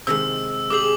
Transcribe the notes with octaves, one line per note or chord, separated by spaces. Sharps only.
C3 D#3 G#3 E6
G4 G#4 D6 E6 F#7